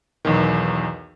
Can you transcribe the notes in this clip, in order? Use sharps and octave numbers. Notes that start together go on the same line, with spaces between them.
B1 E2 D#3